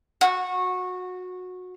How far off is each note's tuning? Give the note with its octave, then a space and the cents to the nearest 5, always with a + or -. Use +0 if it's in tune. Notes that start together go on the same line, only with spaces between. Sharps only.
F#4 -20